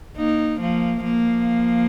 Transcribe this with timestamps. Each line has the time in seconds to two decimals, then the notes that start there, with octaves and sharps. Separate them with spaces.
0.17 A#3 D#4
0.61 F3 A#3
1.04 F3 A#3